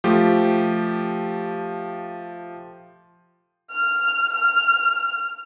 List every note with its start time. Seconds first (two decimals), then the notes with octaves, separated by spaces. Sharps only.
0.04 F3 A3 G4
3.71 F6
4.33 F6